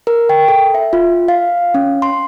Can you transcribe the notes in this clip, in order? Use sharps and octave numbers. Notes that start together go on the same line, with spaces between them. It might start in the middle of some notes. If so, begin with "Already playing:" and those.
A#4
G5
A4
E5
F4
F5
C#4
C6